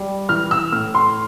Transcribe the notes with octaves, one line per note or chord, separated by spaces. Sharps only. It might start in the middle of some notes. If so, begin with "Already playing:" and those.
Already playing: G3
E3 F6
E6
A2 F6
C6